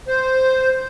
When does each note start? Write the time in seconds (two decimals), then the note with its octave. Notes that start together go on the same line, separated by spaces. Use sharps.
0.08 C5